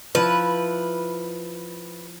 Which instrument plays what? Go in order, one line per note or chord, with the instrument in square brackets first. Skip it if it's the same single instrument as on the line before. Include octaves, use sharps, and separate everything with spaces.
[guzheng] F3 E4 [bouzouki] B4